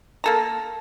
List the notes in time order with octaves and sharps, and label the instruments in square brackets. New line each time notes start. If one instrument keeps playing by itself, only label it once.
[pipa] A#3 A4 A#5